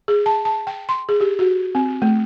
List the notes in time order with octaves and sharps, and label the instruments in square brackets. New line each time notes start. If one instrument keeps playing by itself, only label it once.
[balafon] G#4
A5
A5
G5
C6
G#4
G4
F#4
C4
A3